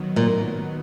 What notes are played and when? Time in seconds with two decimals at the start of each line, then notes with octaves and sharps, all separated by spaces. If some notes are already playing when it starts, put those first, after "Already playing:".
Already playing: D#3 F#3 B3
0.16 A#2